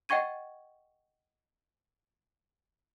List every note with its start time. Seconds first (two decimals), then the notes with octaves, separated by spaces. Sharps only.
0.09 D#5 F#5 G5 C#6 G#6 D#7